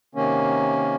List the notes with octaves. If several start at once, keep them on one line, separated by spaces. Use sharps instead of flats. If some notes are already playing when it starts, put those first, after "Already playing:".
C3 D#3 A#3 C#4